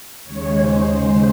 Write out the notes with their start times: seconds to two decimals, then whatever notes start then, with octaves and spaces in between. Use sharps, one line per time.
0.24 D#2 C#3 G#3 C#5
0.56 C5
0.89 C5